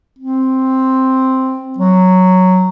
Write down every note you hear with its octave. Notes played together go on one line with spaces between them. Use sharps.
C4
F#3